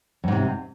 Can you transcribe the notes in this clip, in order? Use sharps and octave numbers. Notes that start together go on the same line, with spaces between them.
F2 G#2 C3